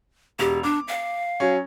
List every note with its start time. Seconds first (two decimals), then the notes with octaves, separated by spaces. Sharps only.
0.39 E1 G4 F7
0.63 D4 D6
0.88 F5
1.40 F#3 C#4